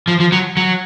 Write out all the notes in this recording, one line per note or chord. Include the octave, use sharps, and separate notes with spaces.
F3
F3
F#3
F#3